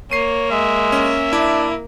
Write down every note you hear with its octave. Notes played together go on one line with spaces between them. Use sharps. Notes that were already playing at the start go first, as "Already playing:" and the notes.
A#3 C#5 C7 D#7
G#3 E5
C#4
D4 E4